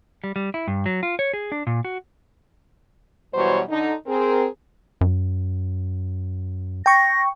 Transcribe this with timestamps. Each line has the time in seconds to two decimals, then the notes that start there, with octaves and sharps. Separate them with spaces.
0.24 G3
0.36 G3
0.54 E4
0.67 G2
0.86 F#3
1.03 F4
1.19 C#5
1.33 G#4
1.52 D4
1.67 A#2
1.85 F#4
3.34 B2 E3 F#3 G3 C5 C#5
3.70 D3 D#4
4.07 C4 G#4 A#4
5.01 F#2
6.86 G5 C#6 A#6